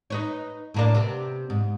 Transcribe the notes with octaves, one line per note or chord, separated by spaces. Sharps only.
D#4 B4 C#5
A2 A#3 D4
C3 B3
G#2